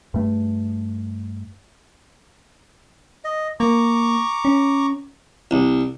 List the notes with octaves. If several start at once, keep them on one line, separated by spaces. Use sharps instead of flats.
G2 A3
D#5
A#3 A#5 C#6 D6
C#4
C2